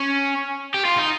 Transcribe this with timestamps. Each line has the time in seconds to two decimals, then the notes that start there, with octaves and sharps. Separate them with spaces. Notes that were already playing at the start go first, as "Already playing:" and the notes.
Already playing: C#4
0.74 G4
0.85 F4
0.97 D#4